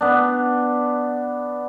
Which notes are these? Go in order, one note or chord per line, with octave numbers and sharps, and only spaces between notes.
B3 D4